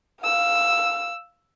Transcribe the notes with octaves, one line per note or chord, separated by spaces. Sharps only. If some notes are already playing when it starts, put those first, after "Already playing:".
F5 E6